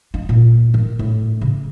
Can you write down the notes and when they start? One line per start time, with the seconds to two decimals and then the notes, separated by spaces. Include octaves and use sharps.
0.14 D#4
0.29 A#2
0.74 D#3
0.99 A2
1.41 C#3